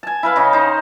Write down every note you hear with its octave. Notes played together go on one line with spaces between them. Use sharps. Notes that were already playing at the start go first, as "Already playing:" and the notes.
G#5 A5
E4 B4 F5
C#3 D#5 G5
D#4 C5